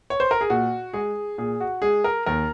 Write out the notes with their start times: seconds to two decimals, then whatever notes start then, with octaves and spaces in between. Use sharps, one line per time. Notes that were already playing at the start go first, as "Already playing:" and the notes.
0.10 C#5
0.20 C5
0.31 A#4
0.41 G#4
0.50 A#2 F#4
0.94 G#3 G#4
1.38 A#2 G#4
1.60 F#4
1.82 G#3 G#4
2.04 A#4
2.26 D#2 A#4